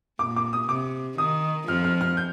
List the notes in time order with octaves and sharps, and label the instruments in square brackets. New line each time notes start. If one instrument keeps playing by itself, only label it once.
[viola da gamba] A#2 [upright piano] D6
[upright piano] D6
D#6
[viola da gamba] C3 [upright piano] D6
[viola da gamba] D#3 [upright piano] D#6
[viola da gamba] F2 F3 [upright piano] F6
[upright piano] F6
F6
G6